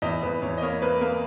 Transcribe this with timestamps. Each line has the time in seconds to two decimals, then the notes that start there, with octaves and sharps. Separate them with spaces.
0.02 E2 D#5
0.22 E2 B4
0.42 E2 C#5
0.57 D#5
0.62 A#3 C#5
0.82 A#3 B4
1.01 A#3